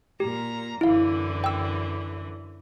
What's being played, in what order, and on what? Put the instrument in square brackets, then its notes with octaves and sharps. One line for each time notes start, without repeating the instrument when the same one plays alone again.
[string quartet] A#2 A#5 [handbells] G4
[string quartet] F#2 D3 E3 [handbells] E4 F5
[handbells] G5 E6